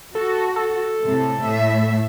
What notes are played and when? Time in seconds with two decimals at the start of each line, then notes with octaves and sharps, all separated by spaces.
0.15 F#4 A4
0.56 A4
1.04 A2 C3
1.42 A2 E5